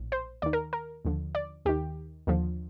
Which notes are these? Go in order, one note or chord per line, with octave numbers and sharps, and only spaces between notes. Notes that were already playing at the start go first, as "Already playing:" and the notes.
Already playing: A#1 A2
C5
D#2 D#3 D5
A#4
A#4
D#2 D3 F3
D5
D#2 D#3 G4
D#2 D3 F3